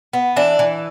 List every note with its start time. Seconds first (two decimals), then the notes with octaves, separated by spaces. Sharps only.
0.13 B3
0.36 E3 D4
0.59 E3